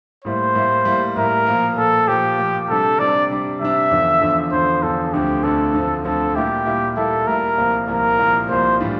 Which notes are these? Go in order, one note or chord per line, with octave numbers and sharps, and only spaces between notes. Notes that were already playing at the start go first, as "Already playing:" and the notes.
A2 G3 A#3 E4 C5
A2 G3 A#3 E4
A2 G3 A#3 E4
A2 G3 A#3 E4 A#4
A#2 F3 A#3
A#2 F3 A#3 A4
A#2 F3 A#3 G4
A#2 F3 A#3
C3 G3 D4 A4
C3 G3 D4 D5
C3 G3 D4
C3 G3 D4 E5
E2 D3 F3
E2 D3 F3
E2 D3 F3 C5
E2 D3 F3 A4
D2 D3 F3 C4 G4
D2 D3 F3 C4 A4
D2 D3 F3 C4
D2 D3 F3 C4 A4
A#2 G3 A#3 E4 G4
A#2 G3 A#3 E4
A#2 G3 A#3 E4 A4
A#2 G3 A#3 E4 A#4
C2 A#2 F3 A#3
C2 A#2 F3 A#3 A#4
C2 A#2 F3 A#3
C2 A#2 F3 A#3 C5
A2 E3 G3 D4 F4